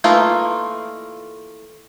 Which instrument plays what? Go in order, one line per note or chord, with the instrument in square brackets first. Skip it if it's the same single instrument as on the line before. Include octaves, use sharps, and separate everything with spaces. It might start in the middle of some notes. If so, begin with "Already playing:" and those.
[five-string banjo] E3 A3 A#3 D#4 F4